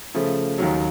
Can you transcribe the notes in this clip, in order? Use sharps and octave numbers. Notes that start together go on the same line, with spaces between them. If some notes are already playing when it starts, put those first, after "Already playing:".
C#3 F3 A3
D#2 D#3 F#3